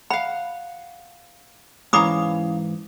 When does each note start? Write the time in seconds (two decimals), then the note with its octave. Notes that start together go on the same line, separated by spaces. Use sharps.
0.10 F5 F#5 B5
1.93 G#2 E3 C#4 F5 A#5 B5 D6 D#6